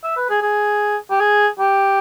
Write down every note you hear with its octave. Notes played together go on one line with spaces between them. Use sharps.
E5
B4
G#4
G#4
G4
G#4
G4